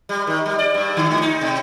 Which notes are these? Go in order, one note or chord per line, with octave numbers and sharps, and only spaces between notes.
G3
D#3
G3
D5
G2
D3
G#2
D#4
B2